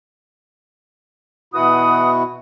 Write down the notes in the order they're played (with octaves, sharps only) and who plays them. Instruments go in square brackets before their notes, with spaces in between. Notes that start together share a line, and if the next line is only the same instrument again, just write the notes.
[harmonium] B2 E4 F#4 [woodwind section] E3 F#5 D#6